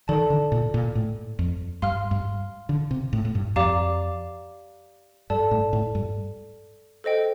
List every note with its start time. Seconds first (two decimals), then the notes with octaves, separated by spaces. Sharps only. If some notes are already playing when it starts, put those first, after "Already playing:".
0.08 D#3 A4 D5 A5
0.30 D3
0.52 A#2
0.74 A#2
0.95 A2
1.39 F2
1.82 G2 F5 C6 F6
2.11 G2
2.69 D3
2.91 C3
3.13 A2
3.25 A2
3.35 G2
3.56 F2 G4 D5 F5 A#5 D6
5.30 G2 A4 D5 A5
5.51 A2
5.73 A2
5.95 G2
7.04 A4 C5 D#5 G5